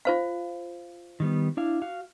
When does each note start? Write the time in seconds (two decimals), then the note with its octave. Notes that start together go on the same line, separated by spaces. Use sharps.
0.05 F4 C5 F5
1.20 D#3 G3 B3
1.57 D4 E4 F5
1.82 F#4 F5